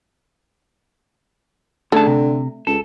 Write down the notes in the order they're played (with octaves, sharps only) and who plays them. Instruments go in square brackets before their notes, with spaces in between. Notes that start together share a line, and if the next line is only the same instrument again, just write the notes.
[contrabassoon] D3 [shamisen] A3 [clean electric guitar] C#4 G#4 A5
[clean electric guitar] C3
[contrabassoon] C#2 [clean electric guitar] A4